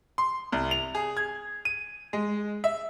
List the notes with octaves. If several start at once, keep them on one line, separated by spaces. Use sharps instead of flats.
C6
C2
F7
G#4
G#6
D#7
G#3
E5